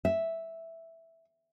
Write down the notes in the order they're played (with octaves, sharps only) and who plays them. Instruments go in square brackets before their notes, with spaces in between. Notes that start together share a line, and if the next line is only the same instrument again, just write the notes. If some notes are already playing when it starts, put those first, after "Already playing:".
[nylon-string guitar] E5